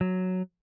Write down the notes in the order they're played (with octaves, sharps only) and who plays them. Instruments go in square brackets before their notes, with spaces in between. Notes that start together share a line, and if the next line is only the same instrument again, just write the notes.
[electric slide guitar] F#3